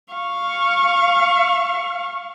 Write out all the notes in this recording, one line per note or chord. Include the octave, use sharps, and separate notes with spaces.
F5 C#6